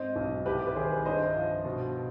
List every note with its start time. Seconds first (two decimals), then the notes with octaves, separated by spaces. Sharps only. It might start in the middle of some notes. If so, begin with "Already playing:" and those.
Already playing: G#2 C4 C5 D#5
0.16 B1
0.45 C2 G4 B4
0.67 B4
0.75 D#3 G#4 C5
1.05 G2 C5 D#5
1.35 F3
1.65 B2